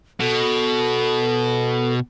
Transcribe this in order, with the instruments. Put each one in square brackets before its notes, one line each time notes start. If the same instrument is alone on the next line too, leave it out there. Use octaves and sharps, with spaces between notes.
[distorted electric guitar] B2 [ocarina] A4